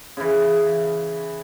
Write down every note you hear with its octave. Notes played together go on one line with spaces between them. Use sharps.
C#3 E3